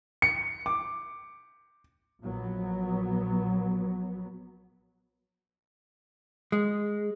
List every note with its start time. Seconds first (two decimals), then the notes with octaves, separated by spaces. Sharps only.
0.22 C#7
0.66 D6
2.22 A#1 F#3 B3
6.52 G#3